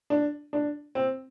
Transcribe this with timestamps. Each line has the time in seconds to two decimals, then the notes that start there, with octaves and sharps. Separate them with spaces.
0.10 D4
0.53 D4
0.95 C4